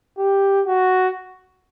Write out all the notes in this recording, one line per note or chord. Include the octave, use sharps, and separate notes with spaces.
G4
F#4